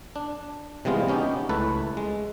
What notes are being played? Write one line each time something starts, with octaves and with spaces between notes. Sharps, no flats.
D4
C3 E3 G3 G#3 B3 F4
B3 C#4 D#4 G4
C#2 A3 E4 B4 A5
G#3